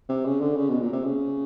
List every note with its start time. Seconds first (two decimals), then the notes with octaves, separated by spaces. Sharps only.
0.09 C3
0.25 C#3
0.40 D3
0.56 C#3
0.69 B2
0.80 A#2
0.92 C3
1.04 C#3